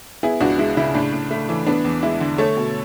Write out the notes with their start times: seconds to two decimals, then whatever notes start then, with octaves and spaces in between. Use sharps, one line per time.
0.23 B3 E4 G#4
0.40 C#2 D4 F#4
0.58 G#3 E4
0.77 C#3 E4
0.95 A2 D4
1.12 A2
1.31 A3
1.49 E3
1.66 B3 D4
1.84 E2
2.03 G#3 E4
2.20 D3
2.38 A3 A4 C#5
2.57 B2